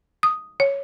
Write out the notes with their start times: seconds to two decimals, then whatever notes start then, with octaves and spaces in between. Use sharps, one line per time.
0.23 D#6
0.60 C#5